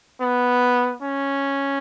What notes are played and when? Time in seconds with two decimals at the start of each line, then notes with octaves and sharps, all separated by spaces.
0.21 B3
1.02 C#4